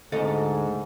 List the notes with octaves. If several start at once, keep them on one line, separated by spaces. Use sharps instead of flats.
D2 G#2 A4 D#5